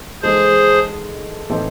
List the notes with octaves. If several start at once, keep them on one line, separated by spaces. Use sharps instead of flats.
E3 G#3 D#4 G#4 A4 C5
A2 E3 C4 D#4 A4